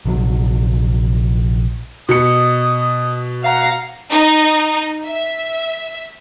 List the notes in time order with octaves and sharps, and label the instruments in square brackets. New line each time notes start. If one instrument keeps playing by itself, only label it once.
[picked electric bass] A#1 C3 F#3
[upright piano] B2 C#7 [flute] D#6
[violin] F5 A#5 [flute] F#5
[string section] D#4
E5